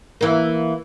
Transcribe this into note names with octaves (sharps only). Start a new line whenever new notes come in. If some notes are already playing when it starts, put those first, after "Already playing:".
E3 A#3